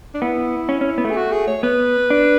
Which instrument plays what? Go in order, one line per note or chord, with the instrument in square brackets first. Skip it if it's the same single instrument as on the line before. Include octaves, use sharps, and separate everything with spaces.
[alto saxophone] D4
[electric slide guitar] B3 [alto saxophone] E4
[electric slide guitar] C#4
C#4
B3
A3
[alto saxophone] G#4
F#4
G#4
C#5
[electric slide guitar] B3 [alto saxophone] B4
[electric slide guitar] D4